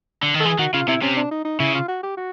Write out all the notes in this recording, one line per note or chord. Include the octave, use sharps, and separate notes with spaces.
D3
D#3
A4
E3 G#4
D#3 F#4
C#3 F4
C3 E4
C3 C#4
D4
D#4
D#4
C#3 E4
F4
F#4
G4
F#4